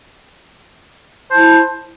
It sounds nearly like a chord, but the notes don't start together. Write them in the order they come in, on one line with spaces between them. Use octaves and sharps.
C5 A5 E4